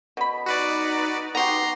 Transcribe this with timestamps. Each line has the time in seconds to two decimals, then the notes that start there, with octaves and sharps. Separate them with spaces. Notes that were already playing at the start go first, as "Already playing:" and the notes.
0.17 B2 B5
0.46 D#4 F#4 B4 D5
1.35 B3 F#4 G4 A#5 C6